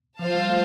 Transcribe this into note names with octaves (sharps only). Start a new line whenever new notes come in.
F3 F4 C5 F5 A5
G3
A3